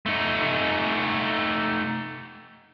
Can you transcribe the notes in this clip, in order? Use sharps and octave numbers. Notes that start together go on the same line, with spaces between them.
A3 D#4